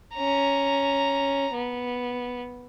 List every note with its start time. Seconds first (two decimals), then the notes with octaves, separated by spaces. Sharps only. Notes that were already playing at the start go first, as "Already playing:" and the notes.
0.15 C#4 A#5
1.53 B3